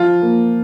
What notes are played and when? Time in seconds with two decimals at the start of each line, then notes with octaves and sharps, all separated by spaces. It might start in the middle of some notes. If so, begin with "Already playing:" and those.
Already playing: F3 F4
0.22 A#3